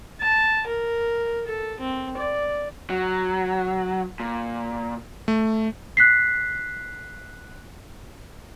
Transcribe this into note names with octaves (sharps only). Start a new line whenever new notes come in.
A5
A#4
A4
C4
D5
F#3
A#2
A3
F#6 B6 C7